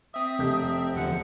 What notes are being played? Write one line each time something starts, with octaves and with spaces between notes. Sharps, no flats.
C4 E5 D#6
F1 G4 G6
E2 D3 F3 F#5